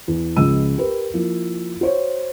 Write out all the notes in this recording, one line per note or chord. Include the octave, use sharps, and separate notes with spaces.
E2
C#2 F3 G#3 E6 D#7
G4 A#4 B4
F3 A#3 E4
F#4 C5 C#5